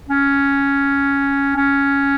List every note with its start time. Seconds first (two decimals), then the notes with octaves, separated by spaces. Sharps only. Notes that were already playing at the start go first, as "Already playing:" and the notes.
0.09 C#4
1.57 C#4